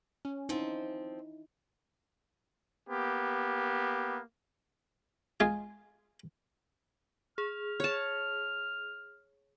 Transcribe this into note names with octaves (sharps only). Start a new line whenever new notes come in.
C#4
F3 C4 D#4 E4
A#3 B3 G4
G#3 F4 G#4
G#4 F6
C#5 A5